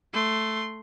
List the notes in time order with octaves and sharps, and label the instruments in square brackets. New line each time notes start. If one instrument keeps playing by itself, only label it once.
[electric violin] A3 C6